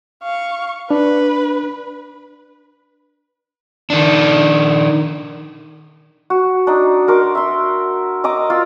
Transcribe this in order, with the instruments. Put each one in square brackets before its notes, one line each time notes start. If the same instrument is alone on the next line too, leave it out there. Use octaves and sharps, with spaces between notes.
[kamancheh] F5 C#6
[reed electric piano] D4 [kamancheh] B4
[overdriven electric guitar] D#3 D4
[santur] F#4
D4 D#4
F#4 A#4 C6 D6
E5 C6
D#5 A#5 D6
F4 E6